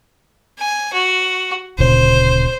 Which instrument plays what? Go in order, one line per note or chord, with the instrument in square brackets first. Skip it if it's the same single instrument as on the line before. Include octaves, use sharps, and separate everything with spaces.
[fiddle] G#5
F#4
[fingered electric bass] D1 A#2 C#3 [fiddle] C5